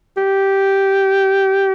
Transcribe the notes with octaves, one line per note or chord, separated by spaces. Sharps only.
G4